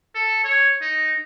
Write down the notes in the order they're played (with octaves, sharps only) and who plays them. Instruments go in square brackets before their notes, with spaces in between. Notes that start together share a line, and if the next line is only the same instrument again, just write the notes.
[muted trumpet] A4
C#5
D#4